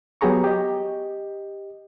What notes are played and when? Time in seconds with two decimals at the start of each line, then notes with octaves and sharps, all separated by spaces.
0.21 F#3 B3 G4 G#4 A#5 C#6
0.44 G4 D#5